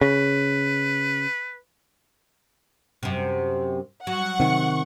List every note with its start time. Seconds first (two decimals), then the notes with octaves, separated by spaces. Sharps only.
0.01 C#3 B4
3.03 F#2 C3
4.07 F#3 F#5 C#6
4.40 C3 D#3